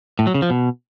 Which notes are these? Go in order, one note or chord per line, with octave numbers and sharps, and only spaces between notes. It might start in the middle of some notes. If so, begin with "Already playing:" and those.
A2
F#3
C#3
F3
B2